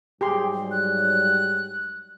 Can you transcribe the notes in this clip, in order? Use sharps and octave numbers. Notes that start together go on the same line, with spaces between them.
G#2 F#3 G3 G4 G#4 C6
F#6